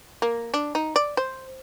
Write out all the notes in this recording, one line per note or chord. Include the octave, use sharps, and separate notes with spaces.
A#3
D4
D#4
D5
C5